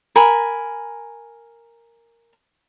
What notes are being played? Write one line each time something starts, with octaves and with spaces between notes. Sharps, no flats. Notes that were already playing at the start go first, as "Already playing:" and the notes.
A#4 G#5 B5